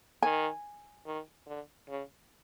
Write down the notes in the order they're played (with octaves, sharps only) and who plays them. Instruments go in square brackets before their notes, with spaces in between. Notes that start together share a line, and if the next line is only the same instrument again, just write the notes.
[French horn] D#3 [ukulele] G#5
[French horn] D#3
D3
C#3